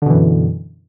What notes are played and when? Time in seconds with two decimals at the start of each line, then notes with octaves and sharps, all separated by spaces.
0.02 D3
0.06 B2
0.10 E3
0.14 F#2